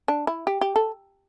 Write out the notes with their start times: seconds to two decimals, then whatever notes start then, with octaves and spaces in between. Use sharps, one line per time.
0.08 D4
0.27 E4
0.47 G4
0.61 G4
0.76 A4